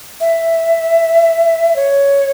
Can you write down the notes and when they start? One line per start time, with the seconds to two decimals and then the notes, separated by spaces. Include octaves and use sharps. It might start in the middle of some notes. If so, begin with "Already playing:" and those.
0.20 E5
1.76 C#5